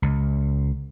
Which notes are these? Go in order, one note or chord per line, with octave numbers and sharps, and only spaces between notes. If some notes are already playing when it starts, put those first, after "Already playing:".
C#2